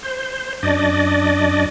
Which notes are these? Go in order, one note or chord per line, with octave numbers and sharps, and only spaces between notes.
C5
F#2 D4 D5 D#5